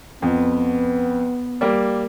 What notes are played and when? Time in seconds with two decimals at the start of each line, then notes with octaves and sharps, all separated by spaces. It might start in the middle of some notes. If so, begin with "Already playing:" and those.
0.22 F2 B3
1.61 G3 A#3